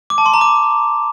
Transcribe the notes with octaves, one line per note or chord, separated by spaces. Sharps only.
D6
A5
C6
A#5
D6